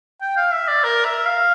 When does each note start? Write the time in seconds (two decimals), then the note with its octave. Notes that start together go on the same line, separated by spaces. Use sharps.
0.21 G5
0.37 F5
0.53 E5
0.68 D5
0.84 A#4
1.05 E5
1.26 F5